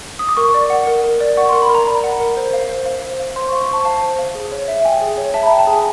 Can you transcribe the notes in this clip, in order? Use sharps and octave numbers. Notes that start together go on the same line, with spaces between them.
D#6
D6
A#4 C#6
D5
F#5
A#4
A#4
D5
F#5 C#6
A#4 C6
B5
A#4
A#5
D5 B5
F#5
A#4
C5
F5
C5
F5
C5
F5
C5 C6
C#6
F5
C#6
C5 A5
F5 A5
C5
F5
G#4
C#5
E5
G5 G#5
G#4
C#5
E5 A5
B5
G5 A#5
A5
G#4
G#5